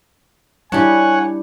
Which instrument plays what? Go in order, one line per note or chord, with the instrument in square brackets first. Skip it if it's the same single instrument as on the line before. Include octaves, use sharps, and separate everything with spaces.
[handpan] G3 E4 [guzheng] D4 G4 [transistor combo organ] C#5 F#5 [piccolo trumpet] G#5